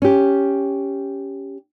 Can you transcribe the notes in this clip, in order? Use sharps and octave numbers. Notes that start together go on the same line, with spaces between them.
C#4 G4